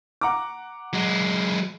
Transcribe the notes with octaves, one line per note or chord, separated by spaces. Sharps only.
F#5 A#5 D6
F#3 G#3